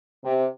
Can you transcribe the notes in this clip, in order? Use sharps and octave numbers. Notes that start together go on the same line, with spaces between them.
C3